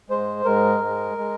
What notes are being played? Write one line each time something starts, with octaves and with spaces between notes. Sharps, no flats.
G#2 G#3 C5
G#2 G#3 A#4
G#2 G#3
G#3